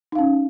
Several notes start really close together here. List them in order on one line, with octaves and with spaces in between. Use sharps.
D#4 F5 C#4